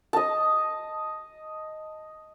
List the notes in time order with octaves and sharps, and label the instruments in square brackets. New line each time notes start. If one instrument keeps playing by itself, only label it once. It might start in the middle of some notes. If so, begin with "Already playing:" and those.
[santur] D#5 A5